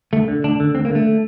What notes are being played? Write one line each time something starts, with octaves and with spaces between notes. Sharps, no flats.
D2 A3
D3
D2 D4
D3
D2 C4
A#3
D3
A3